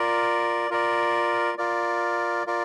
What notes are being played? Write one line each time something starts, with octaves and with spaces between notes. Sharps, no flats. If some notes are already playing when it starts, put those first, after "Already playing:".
Already playing: F4 A#4 D5
F4 A#4 D5
F4 A#4 D5
F4 A#4 D5